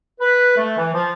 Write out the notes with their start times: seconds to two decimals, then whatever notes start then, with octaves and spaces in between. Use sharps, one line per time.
0.21 B4
0.57 A3
0.78 E3
0.94 F3